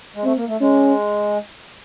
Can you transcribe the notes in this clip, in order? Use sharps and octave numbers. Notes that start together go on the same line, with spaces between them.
G#3
A3 C4
A#3
A3
G#3 C#4